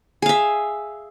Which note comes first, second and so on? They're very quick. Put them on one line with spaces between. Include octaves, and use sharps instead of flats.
G#4 F5 E5